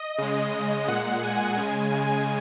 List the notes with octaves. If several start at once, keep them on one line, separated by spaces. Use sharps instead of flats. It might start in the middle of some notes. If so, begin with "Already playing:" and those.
Already playing: D#5
C#3 G#3
A#2 G#3 F#5
G#5
C#3 G#3
G#5